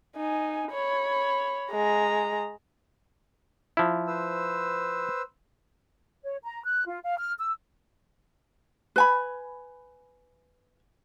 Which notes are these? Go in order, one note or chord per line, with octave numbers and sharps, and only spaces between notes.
D#4 G#5
C#5 B5
G#3 A#5
F3 E4
B4 C5 E6
C#5
A#5
F#6
F4
F5
F6
E6
B4 G#5 B5